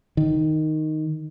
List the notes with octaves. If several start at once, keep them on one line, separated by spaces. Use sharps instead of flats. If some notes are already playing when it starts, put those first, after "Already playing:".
D#3